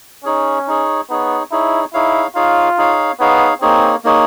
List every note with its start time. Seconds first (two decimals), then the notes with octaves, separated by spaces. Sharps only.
0.24 C#4 D#4 G#4 C#5
0.67 D#4 G#4 C#5
1.10 B3 D#4 G#4 C#5
1.51 D#4 E4 G#4 C#5
1.94 D#4 E4 G#4 C#5 F5
2.35 D#4 F4 G#4 C#5 F5
2.78 D#4 G#4 C#5 F5
3.20 B3 D#4 G#4 C#5 F5
3.62 A#3 C4 D#4 G#4 C#5
4.04 A#3 D#4 G#4 C#5